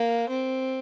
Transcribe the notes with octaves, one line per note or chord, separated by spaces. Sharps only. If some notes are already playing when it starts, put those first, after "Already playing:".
Already playing: A#3
C4